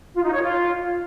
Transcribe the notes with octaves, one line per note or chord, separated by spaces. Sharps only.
F4
D#4
C#5
F4